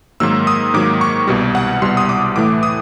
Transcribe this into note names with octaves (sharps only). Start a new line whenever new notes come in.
G#2 D#3 F#3 A#3 E6
D#6
G#2 D#3 F#3 A#3 D6
C#6
C2 B2 G3
F#5
C2 B2 G3 C6
D#6
D6
A2 E3 A3 D6
D#6